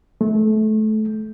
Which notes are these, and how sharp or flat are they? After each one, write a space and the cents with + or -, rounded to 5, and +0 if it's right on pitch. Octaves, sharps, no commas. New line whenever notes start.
A3 -25